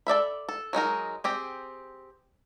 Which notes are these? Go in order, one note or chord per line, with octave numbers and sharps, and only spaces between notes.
A4 D5 E5 B5
A4
F#3 G#3 D#4 A#4
C4 G4 G#4